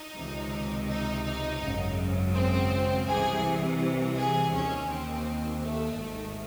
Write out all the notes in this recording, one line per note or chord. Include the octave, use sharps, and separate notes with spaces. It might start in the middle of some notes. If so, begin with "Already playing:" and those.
Already playing: D#4
C#2 C3 D#3
D#4
D#4
G#1 F#2 C#3
C4
C2 C3 E3 G#4
G#4
D#2 D#3 C#4
C4
A3
G#1 G#2 D#3